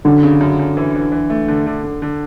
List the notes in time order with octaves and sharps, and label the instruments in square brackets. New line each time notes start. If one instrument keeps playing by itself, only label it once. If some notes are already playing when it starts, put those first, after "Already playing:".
[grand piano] F#2 [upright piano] D3
[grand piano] C#3
F#2
F#2
E3
E3
E3
A3
D3
D3
D3
D3